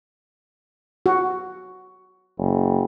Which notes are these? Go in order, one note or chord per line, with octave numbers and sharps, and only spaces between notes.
F#4
F#1